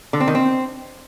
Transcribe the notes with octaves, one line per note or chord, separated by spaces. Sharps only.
D3
C4
D#3
C4